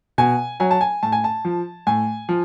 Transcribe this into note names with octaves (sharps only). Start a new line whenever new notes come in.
B2 G#5
F#3 G#5
A5
G#5
A2 A5
G#5
A5
F3
A2 G#5
F3